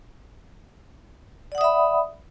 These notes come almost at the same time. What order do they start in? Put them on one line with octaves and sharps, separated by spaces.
D5 F#5 D#6 E5 B5